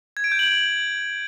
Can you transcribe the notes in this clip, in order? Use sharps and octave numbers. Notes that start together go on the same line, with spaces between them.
G#6
D7
G6
F#7